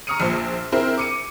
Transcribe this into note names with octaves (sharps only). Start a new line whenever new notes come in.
A#5 C#6 D#6 F6 C#7 D#7
A#1 A#2 C5
C4 E4 G#4 A#4 C5
D6 C#7 D#7